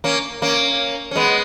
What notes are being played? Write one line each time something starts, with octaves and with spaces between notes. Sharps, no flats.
A#3 C#4
A#3 C#4
C#4
G#3 B3